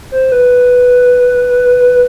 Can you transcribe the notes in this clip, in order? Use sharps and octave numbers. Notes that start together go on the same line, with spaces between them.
C5
B4